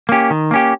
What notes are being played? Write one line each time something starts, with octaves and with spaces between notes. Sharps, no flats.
A#3 C#4 G4
D#3
A#3 C#4 G4